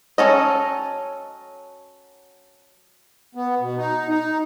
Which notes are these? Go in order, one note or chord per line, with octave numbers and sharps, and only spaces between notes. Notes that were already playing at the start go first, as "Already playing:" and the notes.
F#3 C#4 A4 D#5
B3
B2
D#4
D#4